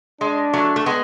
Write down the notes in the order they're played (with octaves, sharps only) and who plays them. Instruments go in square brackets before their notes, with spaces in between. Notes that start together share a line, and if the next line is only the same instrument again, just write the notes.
[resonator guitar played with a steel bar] G#3 [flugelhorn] D4
[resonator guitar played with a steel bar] F#3 A3
A3
G#3 B3